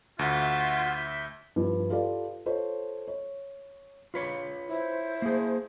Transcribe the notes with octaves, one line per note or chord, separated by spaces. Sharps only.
D2 F4 F#4 E5 G6
G2 F3
F4 G4 A4 B4 D5 F5
F4 A4 C5 C#5
C#5
F4 B4 C#5
E4 C5
A#3 G#4